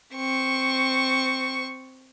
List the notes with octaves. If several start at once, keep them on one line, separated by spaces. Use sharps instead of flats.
C4 C#6